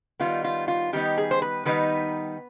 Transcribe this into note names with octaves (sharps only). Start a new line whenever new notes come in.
D#3 G3 B3 D#4 F4
F4
F4
D#3 G3 B3 D#4 G4
G#4
C5
B4
D#3 G3 B3 D#4 B4